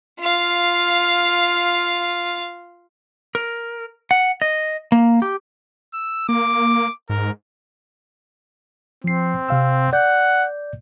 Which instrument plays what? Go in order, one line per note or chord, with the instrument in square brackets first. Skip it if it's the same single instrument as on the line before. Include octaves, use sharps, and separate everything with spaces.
[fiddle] F4 F5
[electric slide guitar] A#4
F#5
D#5
A#3
G4
[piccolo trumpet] E6
[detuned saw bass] A#3 [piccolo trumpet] D6
[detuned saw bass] G#2 [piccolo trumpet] A#4
[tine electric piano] F3 C7 [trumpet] C4
[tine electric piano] C3 F5 E6
[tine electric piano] D5 G6 [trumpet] F#5